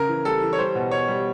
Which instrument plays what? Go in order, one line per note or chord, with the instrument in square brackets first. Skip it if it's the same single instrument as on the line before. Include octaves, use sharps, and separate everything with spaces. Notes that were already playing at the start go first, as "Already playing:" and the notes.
Already playing: [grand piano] C#3 A#4
E3
G3 A4
E3
C#5
G3 C5
B2
B2 C#5
G3